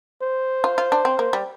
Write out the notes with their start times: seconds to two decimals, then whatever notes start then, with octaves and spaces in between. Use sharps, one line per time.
0.22 C5
0.64 F4
0.78 F4
0.92 D4
1.05 C4
1.19 A#3
1.33 G3